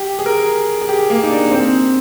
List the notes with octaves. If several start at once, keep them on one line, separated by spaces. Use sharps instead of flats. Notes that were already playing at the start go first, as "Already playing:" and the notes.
Already playing: G4
G#4
A#4
G#4
G4
A#3
D#4
D4
C4